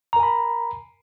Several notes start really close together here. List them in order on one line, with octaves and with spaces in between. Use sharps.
A#5 A#4 G#5 B5